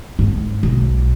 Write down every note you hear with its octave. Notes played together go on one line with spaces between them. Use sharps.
G#2
B1